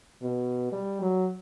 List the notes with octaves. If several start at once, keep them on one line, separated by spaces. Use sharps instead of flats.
B2
G3
F#3